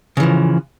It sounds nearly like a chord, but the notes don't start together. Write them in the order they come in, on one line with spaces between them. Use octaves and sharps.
C#3 E3 F3